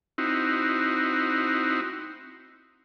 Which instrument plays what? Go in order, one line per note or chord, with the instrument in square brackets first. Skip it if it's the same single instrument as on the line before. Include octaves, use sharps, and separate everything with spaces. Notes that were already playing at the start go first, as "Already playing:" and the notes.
[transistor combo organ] C4 D#4 E4 F#4